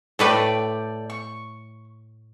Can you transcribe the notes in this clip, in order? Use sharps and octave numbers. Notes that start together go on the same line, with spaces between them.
A2 A3 A4 B4 D5 G5
C#6